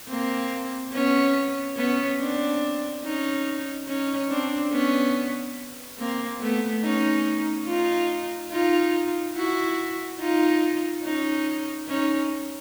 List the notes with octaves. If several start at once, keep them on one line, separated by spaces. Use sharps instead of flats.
A#3 C4
B3 C#4
B3 C#4
C4 D4
C#4 D#4
C#4 D#4
C4 D4
B3 C#4
A#3 C4
A3 B3
C#4 D#4
D#4 F4
D#4 F4
E4 F#4
D#4 F4
C#4 D#4
C#4 D#4